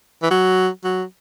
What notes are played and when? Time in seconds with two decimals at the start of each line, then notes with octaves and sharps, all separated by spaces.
0.23 E3
0.31 F#3
0.84 F#3